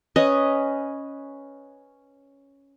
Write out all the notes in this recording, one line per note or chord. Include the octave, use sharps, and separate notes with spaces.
C#4 B4 D#5